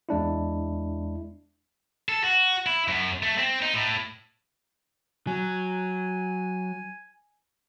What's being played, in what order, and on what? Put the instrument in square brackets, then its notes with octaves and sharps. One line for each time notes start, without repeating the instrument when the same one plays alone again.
[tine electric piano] E2 G#3 D4 E4
[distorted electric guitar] A4
F#4
E4
F#2
A3
C4
D#4
A2
[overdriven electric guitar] F#3 [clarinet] G#5